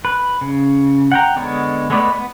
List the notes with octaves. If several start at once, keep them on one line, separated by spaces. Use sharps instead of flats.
B4
C#3
F#5 G5 A#5
D3 G#3 B3 C#5
G#3 A3 B3 B4 D5
B3 B4